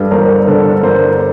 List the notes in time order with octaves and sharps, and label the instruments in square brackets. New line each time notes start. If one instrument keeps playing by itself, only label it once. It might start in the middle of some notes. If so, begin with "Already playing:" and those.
Already playing: [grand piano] G2 [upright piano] A4 B4
[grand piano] G1 [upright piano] A#4 C5
[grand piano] D3 [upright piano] A4 B4
[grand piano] G1 [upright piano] A#4 C5